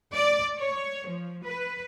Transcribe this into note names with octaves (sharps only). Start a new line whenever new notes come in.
D5
C#5
F3
B4